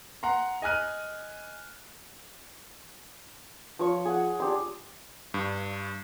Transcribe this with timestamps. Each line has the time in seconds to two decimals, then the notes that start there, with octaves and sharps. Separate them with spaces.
0.23 F#5 A#5 C6
0.62 D#5 G#5 F6 F#6 D#7
3.79 F3 C#5 C#6
4.05 G#4 F#5
4.40 D4 G4 C6
5.34 G2